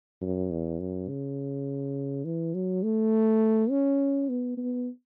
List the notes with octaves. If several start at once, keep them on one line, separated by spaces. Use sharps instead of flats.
F#2
E2
F#2
C#3
E3
F#3
A3
C#4
B3
B3